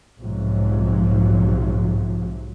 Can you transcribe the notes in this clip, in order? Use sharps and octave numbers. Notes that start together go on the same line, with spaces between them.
B1 G#2 C3 F3 F#3